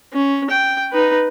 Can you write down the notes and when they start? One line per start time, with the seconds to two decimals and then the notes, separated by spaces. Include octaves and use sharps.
0.13 C#4
0.50 G5
0.92 D#4 B4